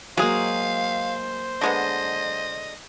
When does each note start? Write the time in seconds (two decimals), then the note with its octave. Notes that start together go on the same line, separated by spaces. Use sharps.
0.17 F#3 G#3 A#3 G#4 C5 F5
1.61 D3 G#3 B3 D#5